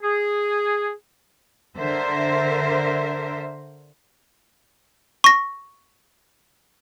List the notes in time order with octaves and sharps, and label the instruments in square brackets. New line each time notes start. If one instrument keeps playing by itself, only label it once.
[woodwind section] G#4
[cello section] D3 A#4 C5 E5
[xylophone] C#6 A#6